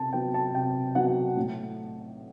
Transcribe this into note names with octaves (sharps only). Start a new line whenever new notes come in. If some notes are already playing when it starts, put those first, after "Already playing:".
Already playing: C3 A5
F#3 B3 G5
A5
C3 G5
F#3 B3 F#5
A2